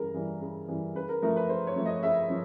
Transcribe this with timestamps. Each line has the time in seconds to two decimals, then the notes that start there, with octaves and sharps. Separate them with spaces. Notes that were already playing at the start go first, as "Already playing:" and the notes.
Already playing: C#3 E3 G3 A#4
0.14 E3 G3
0.41 C#3
0.68 E3 G3
0.95 C#3 B4
1.09 A#4
1.22 F3 A3 A#4
1.36 B4
1.49 C#3 C5
1.67 C#5
1.76 F3 A3
1.86 D#5
2.03 C#3 E5
2.30 F3